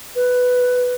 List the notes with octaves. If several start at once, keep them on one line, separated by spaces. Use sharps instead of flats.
B4